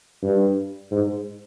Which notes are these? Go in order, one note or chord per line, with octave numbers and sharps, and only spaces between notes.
G2
G#2